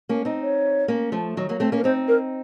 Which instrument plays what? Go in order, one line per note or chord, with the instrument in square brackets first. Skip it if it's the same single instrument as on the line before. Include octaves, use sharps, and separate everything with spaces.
[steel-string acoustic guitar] A#3 C#4
C4 D#4
[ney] C#5
[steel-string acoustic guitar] A#3 C#4
F3 A3
D#3 F#3
F#3 A#3
A3 C4
A#3 C#4
[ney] A#4
[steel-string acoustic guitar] C4 D#4 [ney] C5
[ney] A#4